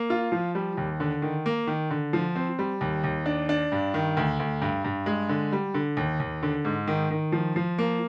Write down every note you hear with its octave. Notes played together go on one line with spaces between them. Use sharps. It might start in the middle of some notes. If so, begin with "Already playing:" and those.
Already playing: A#3
F4
F3
G3
D#2
D3
D#3
A#3
D#3
D3
F3
C4
G3
D#2
D#2
D4
D4
G2
D#3
D2
D2
G2
G2
G#3
D3
G3
D3
D#2
D#2
D3
G#2
D#3
D#3
F3
F3
A#3